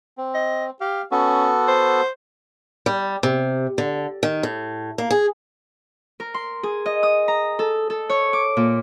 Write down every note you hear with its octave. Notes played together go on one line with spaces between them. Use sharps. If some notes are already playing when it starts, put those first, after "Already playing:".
C4
D#5
G4 F5
B3 C#4 F#4 A4
C5
G3
C3
D3
D#3
A2
A#3
G#4
A#4
C6
G#4
D#5
D#6
A#5
A4
A4
C#5
D6
A#2